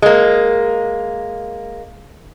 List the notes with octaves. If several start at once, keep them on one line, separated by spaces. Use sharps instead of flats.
G#3 A#3